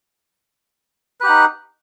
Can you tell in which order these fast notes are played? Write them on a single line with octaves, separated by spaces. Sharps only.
B4 G4 F#5 D#4